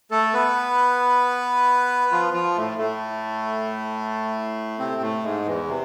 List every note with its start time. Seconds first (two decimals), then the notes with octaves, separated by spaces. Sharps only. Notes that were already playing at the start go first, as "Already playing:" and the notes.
0.11 A3 A4
0.33 B3 B4
2.12 F3 F4
2.33 F3 F4
2.56 A2 A3
2.78 A2 A3
4.79 C3 C4
5.01 A2 A3
5.24 G#2 G#3
5.46 E2 E3
5.68 C3